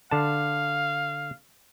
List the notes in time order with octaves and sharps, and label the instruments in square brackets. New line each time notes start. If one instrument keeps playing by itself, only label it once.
[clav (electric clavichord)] D3 A5 [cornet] F5